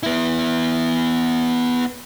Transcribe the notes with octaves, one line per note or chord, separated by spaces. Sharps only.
B3 E4